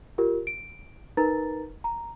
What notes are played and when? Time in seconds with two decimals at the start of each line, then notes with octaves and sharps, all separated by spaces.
0.18 F4 G4 A#4
0.47 D7
1.17 D#4 A#4 B4 A#5 A6
1.84 A#5